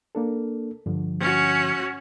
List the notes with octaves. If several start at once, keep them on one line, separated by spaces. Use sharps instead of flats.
A#3 D4 A4
G2 D3 F3
C#4 F#4